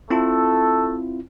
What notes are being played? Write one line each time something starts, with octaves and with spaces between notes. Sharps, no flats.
A3 C4 E4 F4 A4